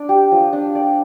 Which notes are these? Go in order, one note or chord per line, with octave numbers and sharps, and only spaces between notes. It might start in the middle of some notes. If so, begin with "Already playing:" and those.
Already playing: D4 D5
G4
F3
D4
D5